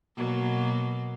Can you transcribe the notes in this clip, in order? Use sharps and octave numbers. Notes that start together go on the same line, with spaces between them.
B2 F#3 A#3